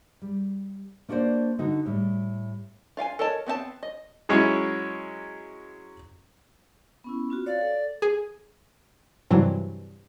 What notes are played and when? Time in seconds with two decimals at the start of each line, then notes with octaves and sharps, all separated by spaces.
0.22 G3
1.09 A#3 D4 F#4 A#4 C5 D5
1.59 D3 D#4 F#4
1.86 A2 G3
2.97 F4 F5 G5 G#5
3.19 A4 A#4 C#5 D#5 A5
3.47 B3 C4 E5 A5
3.83 D#5
4.29 F#3 G#3 C#4 E4 C#5
7.04 B3 C#4 E4
7.30 C4 F4 F#4
7.46 C#5 D5 F5
7.61 A4
8.02 G#4
9.31 G2 C3 E3 F#3